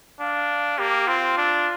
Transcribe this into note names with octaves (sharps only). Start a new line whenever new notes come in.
D4 F5
A#3 G4
C4 F4
D4